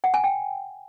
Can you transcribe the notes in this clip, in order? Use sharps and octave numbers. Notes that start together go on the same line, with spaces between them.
F#5
G#5
G5